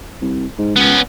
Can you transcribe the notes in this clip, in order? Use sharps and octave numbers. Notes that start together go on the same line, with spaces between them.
C2
G#2
C#2 B3 C#4